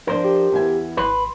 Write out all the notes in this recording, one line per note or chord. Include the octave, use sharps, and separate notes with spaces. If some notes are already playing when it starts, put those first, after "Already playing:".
F3 D4 A#4 C5
G4
E2 E4 G#5
G#1 B4 C6